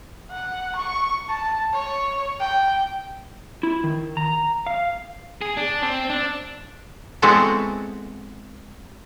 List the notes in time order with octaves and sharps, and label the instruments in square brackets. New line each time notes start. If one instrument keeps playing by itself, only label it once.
[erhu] F#5
C#6
A5
C#5
G5
[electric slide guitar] E4
D#3
A#5
F5
[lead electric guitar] G#4
D4
C4
D4
[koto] G#3 B3 C4 E4 F#4 A4